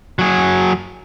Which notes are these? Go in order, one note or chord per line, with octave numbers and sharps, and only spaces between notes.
F#3 G#4